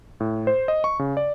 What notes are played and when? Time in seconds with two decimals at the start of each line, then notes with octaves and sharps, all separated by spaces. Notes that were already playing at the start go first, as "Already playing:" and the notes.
0.20 A2
0.47 C5
0.68 D#5
0.84 C#6
0.99 C#3
1.17 D5